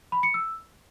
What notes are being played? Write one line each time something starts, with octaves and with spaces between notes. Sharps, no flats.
B5
C#7
E6